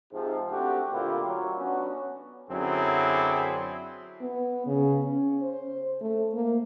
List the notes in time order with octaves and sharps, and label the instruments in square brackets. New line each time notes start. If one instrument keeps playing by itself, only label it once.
[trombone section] G#2 C3 F3
A3 C4 D4 F#4 G4
D2 A#2 A#3 E4 F4 G4
F#3
B3 C#4 D4 F#4
F#2 D3 F#3 C4 E4 G#4
[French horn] B3
C#3
C#4
C5
A3
A#3